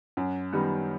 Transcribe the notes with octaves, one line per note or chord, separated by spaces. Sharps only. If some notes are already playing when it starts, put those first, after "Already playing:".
F#2
D#3 G3 B3